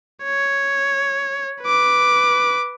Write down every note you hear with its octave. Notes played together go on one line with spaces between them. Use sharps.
C#5
B4 D6